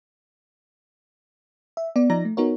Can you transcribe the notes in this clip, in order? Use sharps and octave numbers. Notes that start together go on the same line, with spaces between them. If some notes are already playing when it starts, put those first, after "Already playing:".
E5
B3 D5
F3 D#4 D5 A#5 A#6
A3
B3 D#4 F#4 A#4 C#5